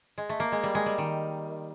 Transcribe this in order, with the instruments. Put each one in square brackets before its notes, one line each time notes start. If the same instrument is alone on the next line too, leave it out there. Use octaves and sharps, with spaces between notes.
[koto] G#3
A3
A#3
G#3
G3
G#3
G3
D#3